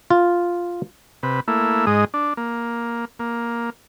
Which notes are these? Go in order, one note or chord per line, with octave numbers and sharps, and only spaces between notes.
F4
C3 B4
A3 A#3 E4
G#2 G#3 D#5
D4
A#3
A#3